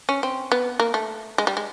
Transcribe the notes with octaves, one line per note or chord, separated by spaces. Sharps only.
C#4
C4
B3
A#3
A3
G#3
G3
G#3